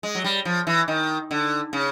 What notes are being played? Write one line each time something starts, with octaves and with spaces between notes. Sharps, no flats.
G#3
F#3
G3
F3
E3
D#3
D3
C#3